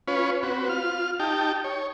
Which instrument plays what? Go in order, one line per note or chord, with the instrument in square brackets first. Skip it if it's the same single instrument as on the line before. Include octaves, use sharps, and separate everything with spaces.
[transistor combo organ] C#4 F4 B4 C#5
C4 F#4 B4
F4 F6
D#4 G4 G5 A5
C#5